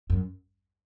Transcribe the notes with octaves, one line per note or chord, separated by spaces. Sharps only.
F#2